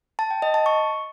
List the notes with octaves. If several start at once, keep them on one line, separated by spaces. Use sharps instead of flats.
A5
G5
D#5
A5
C#6